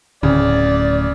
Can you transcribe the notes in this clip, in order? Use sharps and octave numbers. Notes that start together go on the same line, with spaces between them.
D1 C#3 D5